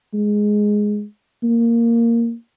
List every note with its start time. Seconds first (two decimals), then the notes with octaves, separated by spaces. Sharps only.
0.14 G#3
1.43 A#3